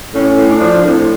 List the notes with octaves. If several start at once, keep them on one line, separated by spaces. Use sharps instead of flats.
A2 C#4
A2
D4
F3
A2 C4